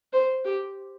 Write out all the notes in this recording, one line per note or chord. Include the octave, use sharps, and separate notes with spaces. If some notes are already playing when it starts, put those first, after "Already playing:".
C5
G4